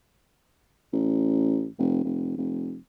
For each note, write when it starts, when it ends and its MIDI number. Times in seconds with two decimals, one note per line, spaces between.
0.93 1.68 33
1.79 2.00 29
2.04 2.36 29
2.37 2.78 29